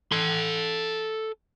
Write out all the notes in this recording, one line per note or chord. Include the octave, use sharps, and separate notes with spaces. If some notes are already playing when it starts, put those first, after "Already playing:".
A4 C6